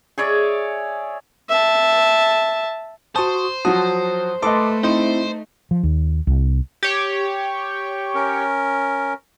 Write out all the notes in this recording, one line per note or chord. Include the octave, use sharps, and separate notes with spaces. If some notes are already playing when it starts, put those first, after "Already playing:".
G#4 C#5 D5 E5
E5 A5
F#4 C5 A5 C#6 D#6
F3 F#3 F#4 A5 D#6
A3 A4 B4 D#5 A5 C6 D6
C4 D#4 E4 C5
F3
D#2
C2
G4 C#5
C#4 A#4